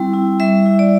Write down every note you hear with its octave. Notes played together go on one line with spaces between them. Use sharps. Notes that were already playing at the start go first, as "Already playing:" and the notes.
Already playing: G3 C4 E4 G5
E4
G3 E5
E4
D5